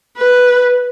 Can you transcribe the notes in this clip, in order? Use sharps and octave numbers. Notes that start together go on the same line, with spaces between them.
B4